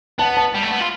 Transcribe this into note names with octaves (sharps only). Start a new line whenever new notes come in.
B3 A5
A5
G3
A3
B3
F4